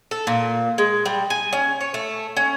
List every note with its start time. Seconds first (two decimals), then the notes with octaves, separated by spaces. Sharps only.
0.11 A4
0.27 A#2
0.78 G#3
1.06 G3
1.30 G#5
1.53 C#4
1.81 C#5
1.94 A3
2.37 C#4